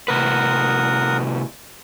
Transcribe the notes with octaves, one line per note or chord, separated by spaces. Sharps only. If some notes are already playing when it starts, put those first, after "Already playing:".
A2 C3 A#4 B4 F#5 D#6